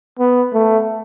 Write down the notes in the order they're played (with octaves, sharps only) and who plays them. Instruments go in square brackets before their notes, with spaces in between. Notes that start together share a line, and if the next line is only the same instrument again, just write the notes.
[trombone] B3
A3